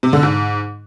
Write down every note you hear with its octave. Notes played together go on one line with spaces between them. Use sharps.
C3
D3
G#2